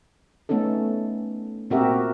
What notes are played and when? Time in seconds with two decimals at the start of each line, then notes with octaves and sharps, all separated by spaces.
0.49 A3 B3 C#4 D#4 A4
1.70 A#2 C4 F#4 G4 A#4 E5